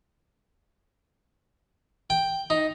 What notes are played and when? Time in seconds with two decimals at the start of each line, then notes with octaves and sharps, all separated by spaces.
2.10 G5
2.50 D#4